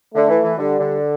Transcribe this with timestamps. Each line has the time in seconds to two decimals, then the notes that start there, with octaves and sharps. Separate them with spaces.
0.14 D3 A3
0.29 E3
0.43 E3
0.58 D3 G3
0.80 D3